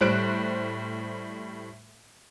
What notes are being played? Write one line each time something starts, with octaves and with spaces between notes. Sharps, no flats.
A2 G3 C5 F#6 D7